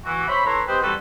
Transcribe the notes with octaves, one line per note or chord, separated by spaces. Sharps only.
E3 F#4
C5 C#5 E5 B5
E4 A4 B4 C#5 A#5 C6
C4 G4 B4 C5 D#5 G5
E3 G3 C4 F#4 A4 B4